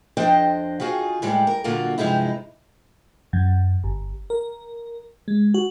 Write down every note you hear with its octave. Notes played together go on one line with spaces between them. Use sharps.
F2 F3 D4 C5 D#5 G5
D#3 F4 F#4 G#4
A2 D#3 G3 G#3
A#4
A#2 D3 F#3 A#3 F4 F#4
G2 C3 F3 G#3 D#4 E4
F#2
G1
A#4
G#3
F#4